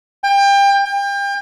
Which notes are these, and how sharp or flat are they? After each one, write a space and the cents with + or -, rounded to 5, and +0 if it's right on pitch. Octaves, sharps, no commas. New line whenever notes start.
G5 +30
G5 +35